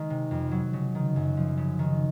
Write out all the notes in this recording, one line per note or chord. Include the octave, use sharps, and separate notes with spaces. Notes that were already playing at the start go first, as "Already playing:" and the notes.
Already playing: D#3 G#3
C3
F2
F#3
C#3
D#3
F#2
F3
C#3
D#3